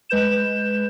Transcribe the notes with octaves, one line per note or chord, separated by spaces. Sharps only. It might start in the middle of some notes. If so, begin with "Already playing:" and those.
G#3 B4 G6 E7